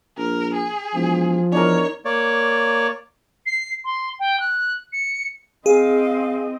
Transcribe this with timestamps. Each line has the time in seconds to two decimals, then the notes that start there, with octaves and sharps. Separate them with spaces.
0.18 A#1 A#4
0.54 G#4
0.95 E1 F3
1.52 E2 D4 D#4 A#4 C#5
2.05 A#3 C#5 D5
3.46 C7
3.84 C6
4.19 G5
4.40 F#6
4.92 C#7
5.66 C4 G#4 D#5 F5